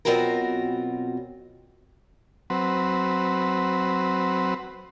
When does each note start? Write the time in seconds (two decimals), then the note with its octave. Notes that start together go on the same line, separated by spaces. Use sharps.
0.05 B2 F#3 C4 F4 F#4 A#4
2.50 F#3 C4 B4